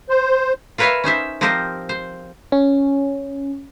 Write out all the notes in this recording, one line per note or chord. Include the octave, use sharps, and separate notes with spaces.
C5
F4 A#4 B4 C#5 E5 F5
C#4 D#4 C5 E5
F3 C4 G4 A#4 C5 D#5
C5
C#4